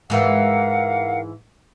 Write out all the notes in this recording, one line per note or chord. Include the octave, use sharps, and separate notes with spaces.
G#2 E3 A#4 F5 F#5